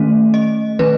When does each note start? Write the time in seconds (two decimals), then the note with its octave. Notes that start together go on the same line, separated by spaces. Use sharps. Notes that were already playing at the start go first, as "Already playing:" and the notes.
Already playing: D#3 A3 C#4
0.34 D#5
0.79 D#3 A3 C#4 B4